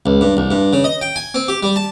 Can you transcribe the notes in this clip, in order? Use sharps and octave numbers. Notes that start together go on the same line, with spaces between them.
C#2
G2
C2
G2
C#3
D#5
G5
G#5
C4
G4
G3
A5